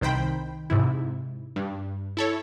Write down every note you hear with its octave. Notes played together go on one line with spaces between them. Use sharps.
C2 D#3 C5 G5 B5
G#2 C3 E4
G2
E4 A4 C#5